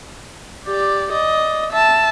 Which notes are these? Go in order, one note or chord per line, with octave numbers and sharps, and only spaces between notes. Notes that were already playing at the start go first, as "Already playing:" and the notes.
G4 D5
D5 D#5
E5 A5